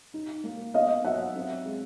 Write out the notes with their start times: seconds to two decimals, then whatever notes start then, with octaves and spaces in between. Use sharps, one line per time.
0.14 D#4
0.44 A#3
0.74 B3 D#5 F5
1.05 F#3 E5 F#5
1.36 C4
1.65 G#3